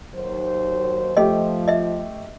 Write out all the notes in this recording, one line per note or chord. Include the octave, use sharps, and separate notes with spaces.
D#2 F#3 C5
F3 A3 G4 D#5
D#5 E5